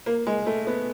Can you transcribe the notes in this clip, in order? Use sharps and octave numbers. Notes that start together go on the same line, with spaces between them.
A#3
G#3
A3
B3